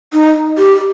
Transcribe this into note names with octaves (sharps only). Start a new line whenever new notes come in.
D#4
G4